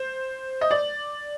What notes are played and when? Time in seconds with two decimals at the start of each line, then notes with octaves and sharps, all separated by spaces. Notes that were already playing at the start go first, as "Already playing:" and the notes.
Already playing: C5
0.61 D#5
0.71 D5